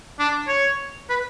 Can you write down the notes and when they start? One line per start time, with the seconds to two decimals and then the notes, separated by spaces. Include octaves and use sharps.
0.19 D4
0.48 C#5
1.10 B4